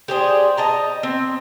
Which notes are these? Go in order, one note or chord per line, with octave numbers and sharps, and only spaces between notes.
G4 G#4 C5 D5
D#5 A5 A#5
C4